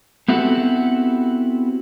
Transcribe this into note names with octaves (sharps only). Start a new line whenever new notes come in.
B3 C4 E4 F#4 G4 A4